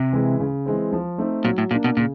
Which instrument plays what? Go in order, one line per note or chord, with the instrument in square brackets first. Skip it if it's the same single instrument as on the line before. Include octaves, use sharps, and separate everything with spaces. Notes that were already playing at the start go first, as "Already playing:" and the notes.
Already playing: [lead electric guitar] C3
[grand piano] E3 G#3
C#3
E3 G#3 C4
F3
A3 C4 D#4
[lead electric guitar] A#2 [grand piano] F#3
[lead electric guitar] A2
[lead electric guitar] A#2 [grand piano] A#3 D4
[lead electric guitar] B2
[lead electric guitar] A#2 [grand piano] C#3